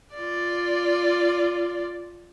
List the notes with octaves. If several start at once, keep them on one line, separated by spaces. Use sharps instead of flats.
F4 D5